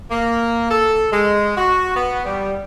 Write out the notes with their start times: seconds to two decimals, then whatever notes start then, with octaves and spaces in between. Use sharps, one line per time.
0.11 A#3
0.71 A4
1.12 G#3
1.57 F#4
1.96 B3
2.26 G3